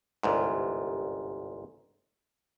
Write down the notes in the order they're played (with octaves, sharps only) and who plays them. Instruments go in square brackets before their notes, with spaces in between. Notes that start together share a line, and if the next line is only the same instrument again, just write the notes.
[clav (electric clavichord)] G1 C2 G#2